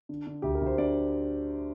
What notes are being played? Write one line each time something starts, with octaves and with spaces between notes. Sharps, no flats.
D3
D3
D2 G4
A#4
D2 C5
D3 D5